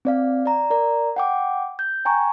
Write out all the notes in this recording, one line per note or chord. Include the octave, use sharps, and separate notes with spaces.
C4 D5 F5
D5 A#5
A#4 D5 A#5
F#5 G5 D6
G6
G5 G#5 A#5 C#6